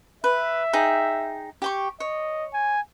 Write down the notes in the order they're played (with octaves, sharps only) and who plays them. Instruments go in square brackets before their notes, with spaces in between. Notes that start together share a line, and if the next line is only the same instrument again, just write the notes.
[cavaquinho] B4 [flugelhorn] E5
[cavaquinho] D#4 G#4 G5
G4 G5 C#6
[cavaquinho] C#5 [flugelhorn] D#5
[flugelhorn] G#5